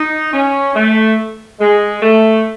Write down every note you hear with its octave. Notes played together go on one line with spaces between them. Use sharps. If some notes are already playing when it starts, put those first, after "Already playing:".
Already playing: D#4
C#4
A3
G#3
A3